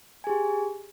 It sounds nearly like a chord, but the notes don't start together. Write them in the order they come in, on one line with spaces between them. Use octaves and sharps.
G#5 G#4 G4